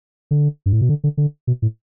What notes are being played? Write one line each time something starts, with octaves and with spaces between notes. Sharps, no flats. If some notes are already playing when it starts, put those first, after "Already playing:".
D3
G2
A2
B2
D3
D3
D3
B2
A2